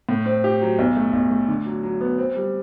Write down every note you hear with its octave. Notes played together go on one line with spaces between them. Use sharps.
A2
C4
G4
F#3
B1
A3
B1
A3
D3
F#3
F#3
B3
C4
G3